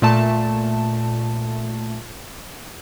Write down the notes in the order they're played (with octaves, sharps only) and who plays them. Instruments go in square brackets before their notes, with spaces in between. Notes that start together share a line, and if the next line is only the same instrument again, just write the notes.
[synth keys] A#2 A3 A5